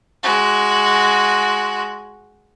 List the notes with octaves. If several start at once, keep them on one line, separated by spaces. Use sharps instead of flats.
G#3 F#4